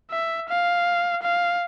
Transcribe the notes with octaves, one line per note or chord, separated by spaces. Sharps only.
E5
F5
F5